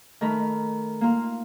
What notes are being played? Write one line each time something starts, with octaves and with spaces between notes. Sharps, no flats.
D#3 A3 A#4 B5
A#3 F4